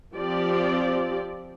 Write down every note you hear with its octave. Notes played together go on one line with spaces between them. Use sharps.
F3 C4 G4 D5